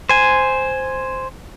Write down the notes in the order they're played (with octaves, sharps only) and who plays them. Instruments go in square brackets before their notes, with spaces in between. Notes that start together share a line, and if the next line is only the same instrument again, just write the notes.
[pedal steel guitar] C5 G#5